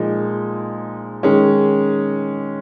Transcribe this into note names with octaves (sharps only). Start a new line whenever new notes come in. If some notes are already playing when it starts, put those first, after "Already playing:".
Already playing: A#2 F3 G#3 D#4
D#3 G#3 C#4